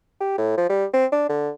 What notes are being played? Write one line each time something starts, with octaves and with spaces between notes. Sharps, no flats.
G4
A2
F3
G3
C4
D4
D3